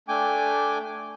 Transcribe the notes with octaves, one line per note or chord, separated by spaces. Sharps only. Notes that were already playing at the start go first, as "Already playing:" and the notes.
A3 D4 G5 G#5 D6